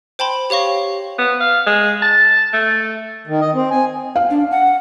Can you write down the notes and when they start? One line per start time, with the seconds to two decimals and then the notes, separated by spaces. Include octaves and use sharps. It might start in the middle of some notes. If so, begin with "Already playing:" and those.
0.19 C5 G5 A5 B5 C6
0.50 G4 C#5 F5 C#6 A#6
1.19 B3
1.40 F5
1.67 G#3
2.02 A5
2.53 A3
3.27 D#3
3.41 D#5
3.54 C4
3.71 G#5
4.16 F5
4.30 D4
4.51 F#5